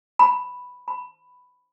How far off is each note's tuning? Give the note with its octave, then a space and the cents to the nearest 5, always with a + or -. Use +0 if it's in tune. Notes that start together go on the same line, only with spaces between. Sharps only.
B5 +0
B5 +5